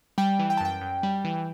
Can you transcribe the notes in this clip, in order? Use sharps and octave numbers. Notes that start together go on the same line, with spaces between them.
G3 G5
E3
G5
A5
F#2 G5
F#2
G3
E3